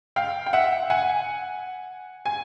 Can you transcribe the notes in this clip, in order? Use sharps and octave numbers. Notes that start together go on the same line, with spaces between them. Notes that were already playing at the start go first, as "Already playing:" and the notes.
F5 G5
G5
E5 F#5
F#5 G#5
G#5